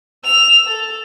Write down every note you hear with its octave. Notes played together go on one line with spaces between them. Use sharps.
E6 F7
A4